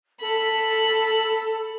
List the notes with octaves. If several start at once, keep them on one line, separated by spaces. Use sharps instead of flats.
A4 B5